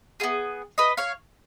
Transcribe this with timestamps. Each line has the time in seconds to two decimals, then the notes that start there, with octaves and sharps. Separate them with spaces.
0.20 F4 G#4
0.23 B3
0.78 B4 D#5
0.97 C#5 F5